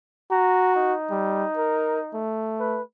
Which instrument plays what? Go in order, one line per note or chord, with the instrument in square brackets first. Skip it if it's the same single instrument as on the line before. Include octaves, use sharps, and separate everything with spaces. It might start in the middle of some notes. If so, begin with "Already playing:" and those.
[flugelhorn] F#4 [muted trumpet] A#5
[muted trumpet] D#4
[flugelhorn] G3
A#4
A3
[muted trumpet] B4